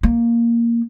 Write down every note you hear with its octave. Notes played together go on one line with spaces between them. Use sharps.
A#3